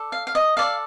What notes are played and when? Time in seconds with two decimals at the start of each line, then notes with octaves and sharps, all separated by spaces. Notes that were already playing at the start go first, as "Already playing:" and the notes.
Already playing: A4 D5
0.12 F5
0.27 F5
0.35 D#5
0.57 A4 D5 F5